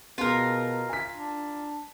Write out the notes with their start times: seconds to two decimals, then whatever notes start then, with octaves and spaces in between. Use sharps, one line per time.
0.18 B2 B3 F4 G#4 A#4
0.89 G#5 B6
1.13 D4